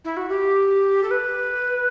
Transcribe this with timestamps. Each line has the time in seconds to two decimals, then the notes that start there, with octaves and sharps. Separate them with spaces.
0.04 E4
0.16 F#4
0.29 G4
1.03 A4
1.10 B4